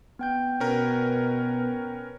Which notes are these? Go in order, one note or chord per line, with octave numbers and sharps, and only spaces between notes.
B3 G5 G6
B2 C#4 A#4 B4